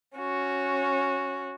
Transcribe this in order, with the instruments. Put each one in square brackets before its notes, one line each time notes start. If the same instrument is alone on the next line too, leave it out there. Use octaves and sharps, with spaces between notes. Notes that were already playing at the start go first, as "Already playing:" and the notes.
[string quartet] C#4 F#4